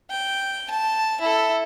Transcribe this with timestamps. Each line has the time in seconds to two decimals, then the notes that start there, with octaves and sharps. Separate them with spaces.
0.11 G5
0.71 A5
1.21 E4 A4